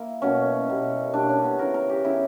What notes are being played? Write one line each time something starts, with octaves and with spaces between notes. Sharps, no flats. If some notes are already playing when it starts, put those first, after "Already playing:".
Already playing: A#3 E4
B2 F#3 A#3 C#4
B2 G3 A#3
B2 G3 A#3 D4
C#4
B3
C#3 E3 B3 A#4
A#4
G4
C#3 E3 B3 E4